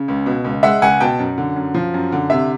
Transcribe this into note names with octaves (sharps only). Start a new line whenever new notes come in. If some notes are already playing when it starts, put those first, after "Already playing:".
Already playing: C#3
C#2
B2
C#2
G#3 E5 F#5
C#2 F#5 G#5
B2 G5 A5
F#2
D3
F#2
F3
F#2
D3
C3 E5